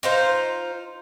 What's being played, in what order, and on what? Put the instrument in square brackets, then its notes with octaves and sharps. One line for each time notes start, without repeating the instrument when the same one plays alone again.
[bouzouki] D#4 F4 C5